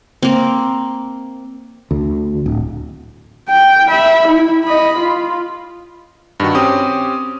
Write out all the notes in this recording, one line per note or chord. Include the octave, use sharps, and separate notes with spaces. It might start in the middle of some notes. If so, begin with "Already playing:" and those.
A#3 C4
D2
D1
G5
E5 B5
E4
D#5 B5
F4
G2 D#3 F#4
C4 C#4 G4 D#6